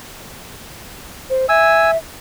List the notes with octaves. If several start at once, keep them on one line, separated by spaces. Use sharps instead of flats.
C5
E5 G#5 E6